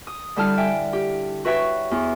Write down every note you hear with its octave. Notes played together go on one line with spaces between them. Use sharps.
D#6
D3 G3 E4 A4 A5 F6
D5 E5 G5 G#5
G4
F#4 B4 C#5 E5 G5 C#6
E2